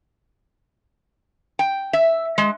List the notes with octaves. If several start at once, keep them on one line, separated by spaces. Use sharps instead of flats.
G5
E5
G#3